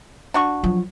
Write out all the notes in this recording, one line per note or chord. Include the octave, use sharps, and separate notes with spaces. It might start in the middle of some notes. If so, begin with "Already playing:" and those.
D4 F#4 C#6
F3 F#3